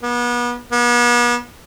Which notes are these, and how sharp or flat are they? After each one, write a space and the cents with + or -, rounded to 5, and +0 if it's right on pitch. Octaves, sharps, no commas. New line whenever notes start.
B3 -35
B3 -40